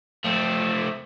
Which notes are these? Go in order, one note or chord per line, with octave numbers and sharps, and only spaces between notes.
A3 C4